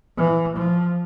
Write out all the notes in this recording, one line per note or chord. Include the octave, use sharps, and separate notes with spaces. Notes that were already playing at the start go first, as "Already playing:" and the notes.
E3
F3